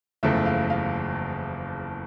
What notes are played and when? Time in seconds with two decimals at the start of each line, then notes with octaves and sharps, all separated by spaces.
0.23 F#1 E2 C#3 F3 A3 E5
0.46 F5
0.70 F5